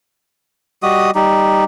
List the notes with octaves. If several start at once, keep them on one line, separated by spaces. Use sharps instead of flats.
G3 F#4 D#5 D#6
G3 D#4